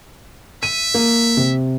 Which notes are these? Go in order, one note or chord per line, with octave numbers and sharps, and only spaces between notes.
E5 D#7
A#3
C3